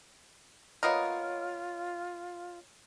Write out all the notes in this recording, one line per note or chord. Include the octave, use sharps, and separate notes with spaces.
A#3 B3 F4 A#4 C#5 D#5